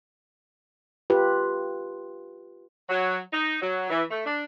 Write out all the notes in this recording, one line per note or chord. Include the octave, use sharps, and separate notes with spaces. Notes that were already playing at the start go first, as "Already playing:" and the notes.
F4 G4 B4
F#3
D#4
F#3
E3
A3
D4